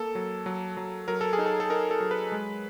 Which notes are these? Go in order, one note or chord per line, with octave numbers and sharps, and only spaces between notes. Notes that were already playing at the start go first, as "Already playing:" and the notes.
Already playing: A#3 A4
F#3
F#3
F#3
F#3 A#4
A4
G#4
D#4
A4
A4
D#4 A#4
A4
F#3
B4
G#3